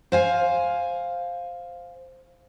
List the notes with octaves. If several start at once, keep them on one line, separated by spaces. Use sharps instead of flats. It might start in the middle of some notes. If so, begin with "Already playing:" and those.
C5 F5 G#5